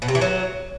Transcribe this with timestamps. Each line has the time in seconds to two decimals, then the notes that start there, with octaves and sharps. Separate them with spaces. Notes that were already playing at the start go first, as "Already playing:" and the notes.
0.02 B2
0.08 C3
0.15 E3
0.21 F#3